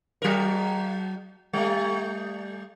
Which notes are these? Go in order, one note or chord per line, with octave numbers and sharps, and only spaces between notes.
F#3 A#4
G3 A3